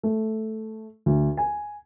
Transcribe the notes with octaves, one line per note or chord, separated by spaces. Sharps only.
A3
D2
G#5